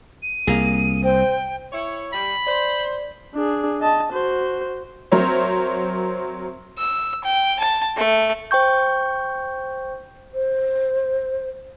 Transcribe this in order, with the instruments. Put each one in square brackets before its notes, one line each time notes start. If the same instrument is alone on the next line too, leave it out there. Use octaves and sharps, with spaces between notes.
[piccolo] D#7
[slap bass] C2 [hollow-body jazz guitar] A#3 G#4
[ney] C5 [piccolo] G5
[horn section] E4 C#5
[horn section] G3 [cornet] B5
[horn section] C5 [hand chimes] D5
[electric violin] D4 G#4
D#5 A5
F#4 C5
[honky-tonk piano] F#3 C4 A#4 C5 C#5 E5
[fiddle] E6
G5
A5
A3
[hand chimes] C5 G5 C#6 G6
[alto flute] C5